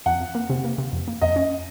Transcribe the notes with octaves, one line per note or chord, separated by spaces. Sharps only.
F2 F#5
F2
A#3
C3
A#3
C3
F2
A#3
F2 D#5
C#4